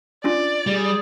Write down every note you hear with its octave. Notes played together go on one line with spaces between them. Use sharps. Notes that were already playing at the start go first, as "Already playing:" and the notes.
C#4 D4 F4 D5
G3 G#4